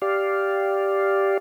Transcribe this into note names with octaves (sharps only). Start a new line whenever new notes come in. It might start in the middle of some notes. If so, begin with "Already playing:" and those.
G4 D5 F5